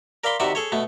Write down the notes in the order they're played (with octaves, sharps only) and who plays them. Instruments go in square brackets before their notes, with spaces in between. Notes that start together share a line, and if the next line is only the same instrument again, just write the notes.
[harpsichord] A#4 D5 F5 B5 C6
C3 D#3 F#4 D5 E5 B5
G#4 A4 C#5
B2 A3 B3